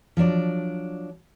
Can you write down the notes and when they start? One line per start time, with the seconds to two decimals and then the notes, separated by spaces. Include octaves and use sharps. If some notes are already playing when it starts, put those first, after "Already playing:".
0.17 F3 F#3 D4 D5